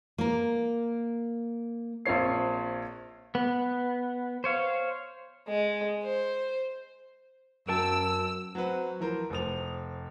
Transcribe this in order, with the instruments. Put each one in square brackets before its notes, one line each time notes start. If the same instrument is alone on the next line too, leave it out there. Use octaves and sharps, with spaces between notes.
[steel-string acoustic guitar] A#3 A#4
[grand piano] A#1 C4 F4 C#5 C7
[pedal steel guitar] B3
C5 C#5 F5
[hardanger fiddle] G#3
C5
[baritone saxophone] F#2 [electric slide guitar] A#4 G5 A5 [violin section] E6
[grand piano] F#3 C4 F#4 B4
E3 F3 A#4 C5
F1 F3 D#6 F7